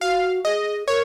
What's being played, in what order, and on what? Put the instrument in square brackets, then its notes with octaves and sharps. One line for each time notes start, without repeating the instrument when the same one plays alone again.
[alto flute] F#4 [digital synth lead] F5
[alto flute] G#4 [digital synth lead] D#5
[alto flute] A#4 [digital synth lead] C#5